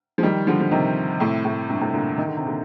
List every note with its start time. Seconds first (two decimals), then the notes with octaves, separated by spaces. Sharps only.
0.18 F3
0.23 D#3 G3
0.47 D3 F3
0.60 F3
0.71 C3 D#3
1.20 A2 C3
1.45 A2
1.68 G2 A#2
1.81 A2 C3
1.93 A#2 D3
2.18 D#3
2.27 D3
2.37 C3
2.46 A#2 D3